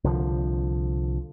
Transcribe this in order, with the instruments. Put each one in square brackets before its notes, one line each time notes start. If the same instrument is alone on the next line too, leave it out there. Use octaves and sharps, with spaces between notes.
[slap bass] C2 D3 F3